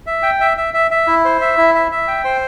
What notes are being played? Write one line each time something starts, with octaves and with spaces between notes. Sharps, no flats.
E5
G5
E5
E5
E5
E5
E4
C5
E5
E4
E5
E5
G5
C5